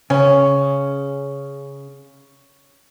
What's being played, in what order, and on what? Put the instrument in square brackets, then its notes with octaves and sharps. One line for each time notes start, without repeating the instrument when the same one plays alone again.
[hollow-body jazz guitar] C#3 [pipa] C#4